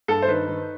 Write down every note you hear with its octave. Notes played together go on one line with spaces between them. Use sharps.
G2 A4
C5
D#3 B4
D#3